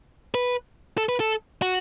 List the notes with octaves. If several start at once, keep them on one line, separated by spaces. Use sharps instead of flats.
B4
A4
B4
A4
F#4